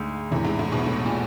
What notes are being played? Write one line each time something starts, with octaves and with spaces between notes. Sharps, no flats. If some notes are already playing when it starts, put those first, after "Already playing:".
Already playing: D2 G#2
E2 A2 C3 E3
G#2
A2
B1 B2
A2
A#2